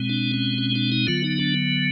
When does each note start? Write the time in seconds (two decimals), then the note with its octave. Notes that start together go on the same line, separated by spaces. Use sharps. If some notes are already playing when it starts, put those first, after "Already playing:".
Already playing: B2 G#3 C4
0.09 D4
0.34 C#4
0.58 C#4
0.75 D4
0.92 D#4
1.07 D3 F#3 B3 F4
1.24 D#4
1.40 D4